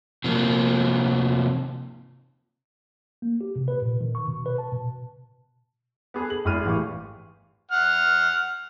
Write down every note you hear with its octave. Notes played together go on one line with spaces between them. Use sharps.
C3 F3 A#3
A#3
G4
C3
B4
A#2
D#3
C#6
B2
B4
A5
B2
B3 G#4 A4 B4
F#7
G#1 E4 G#4 C6 F6 D#7
A2 E3 G4 F5 C#6
F#5 F6